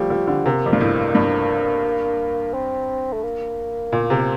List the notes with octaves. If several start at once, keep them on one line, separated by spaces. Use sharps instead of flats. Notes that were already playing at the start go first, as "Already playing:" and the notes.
Already playing: F3 G3 A3
F3
D3
C3 A#3
F2
G2
A2
G2
C4
A3
A#3
A#2
C3